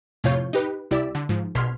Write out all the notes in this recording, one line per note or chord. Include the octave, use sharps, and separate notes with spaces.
F2 A2 C3 F4 C#5 G6
D#4 G4 B4
C2 E4 G4 D5 E6 B6
D3
G#2 F3
A#1 B2 C6 F6 G#6 B6